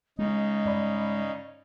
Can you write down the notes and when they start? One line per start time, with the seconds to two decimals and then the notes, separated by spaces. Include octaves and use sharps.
0.18 C#3 G#3 D#4 D#5
0.65 G2 D5 B5